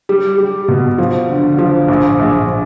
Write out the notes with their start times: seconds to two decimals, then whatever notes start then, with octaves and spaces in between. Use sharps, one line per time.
0.09 G3
0.38 G3
0.68 B2
0.98 F3
1.29 D3
1.58 F3
1.88 A#1
2.20 A#1